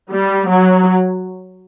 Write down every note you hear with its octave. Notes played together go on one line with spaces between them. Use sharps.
G3
F#3